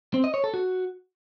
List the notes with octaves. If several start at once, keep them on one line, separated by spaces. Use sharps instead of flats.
C4
D#5
C#5
A4
F#4